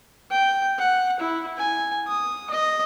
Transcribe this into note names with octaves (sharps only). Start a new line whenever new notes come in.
G5
F#5
E4
G#5
D#6
D#5